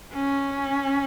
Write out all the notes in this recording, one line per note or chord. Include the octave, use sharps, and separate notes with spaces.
C#4